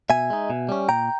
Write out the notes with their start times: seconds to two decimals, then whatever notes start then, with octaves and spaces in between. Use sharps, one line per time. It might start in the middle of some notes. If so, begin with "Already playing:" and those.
0.10 B2 E5 G#5
0.30 G#3 D#4
0.50 B2
0.69 G3 C#4
0.89 A#2 G5 A#5